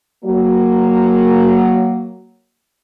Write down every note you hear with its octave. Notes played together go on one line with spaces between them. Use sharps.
F#3 A#3